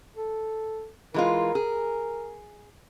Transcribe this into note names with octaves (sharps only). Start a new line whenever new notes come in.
A4
E3 G#3 F4 A#4
G#4